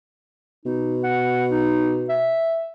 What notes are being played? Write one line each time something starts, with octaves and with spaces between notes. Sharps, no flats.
B2 D#4
F#5
D#4
E5